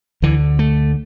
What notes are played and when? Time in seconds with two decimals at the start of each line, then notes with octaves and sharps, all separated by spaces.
0.22 D2 D3 E3
0.59 A3